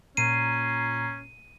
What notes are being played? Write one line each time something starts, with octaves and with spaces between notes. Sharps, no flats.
A#2 C#4 A#5 C7 D#7